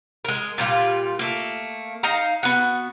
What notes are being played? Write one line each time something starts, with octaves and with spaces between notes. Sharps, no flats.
G#3 A#4
A#2 G3 F4
A3 A#3
D#4 F5 A#5
B3 F#4